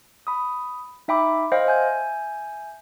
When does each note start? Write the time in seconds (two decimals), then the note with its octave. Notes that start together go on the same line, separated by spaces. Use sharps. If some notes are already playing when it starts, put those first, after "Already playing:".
0.27 B5 D#6
1.08 D#4 E5 G5 B5 D6
1.52 C5 D#5 F5 G5
1.66 E5 G#5 G6